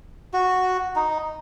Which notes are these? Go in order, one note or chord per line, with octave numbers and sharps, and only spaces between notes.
F#4
D#4